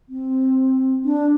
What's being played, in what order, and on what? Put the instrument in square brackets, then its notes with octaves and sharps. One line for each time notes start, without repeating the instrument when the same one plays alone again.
[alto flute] C4
D4